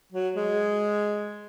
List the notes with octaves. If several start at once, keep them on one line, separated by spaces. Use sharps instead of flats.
F#3
G#3